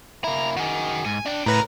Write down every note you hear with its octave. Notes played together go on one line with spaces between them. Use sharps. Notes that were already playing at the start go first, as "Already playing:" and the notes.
A#3 E4 A#5
D#3 F#4 G#4
G#2 G#5
C#3 D4 G5
A2 C#3 A#4 B4 A#5